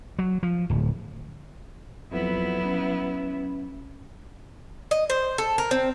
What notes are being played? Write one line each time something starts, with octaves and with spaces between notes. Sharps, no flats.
F#3
F3
D1
F2 F#3 B3 E4
C#4
D#5
C5
A4
A#4
C4